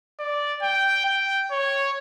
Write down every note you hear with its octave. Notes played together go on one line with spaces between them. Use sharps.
D5
G5
G5
C#5